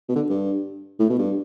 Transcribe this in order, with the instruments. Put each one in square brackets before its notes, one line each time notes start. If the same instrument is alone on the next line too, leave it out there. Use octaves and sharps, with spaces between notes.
[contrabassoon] B2
D3
G2
A2
B2
G2